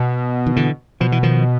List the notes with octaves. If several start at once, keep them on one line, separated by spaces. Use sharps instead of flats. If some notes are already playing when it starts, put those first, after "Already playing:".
Already playing: B2
D#3
D3 E3
B2 F3
E3
D#3 F3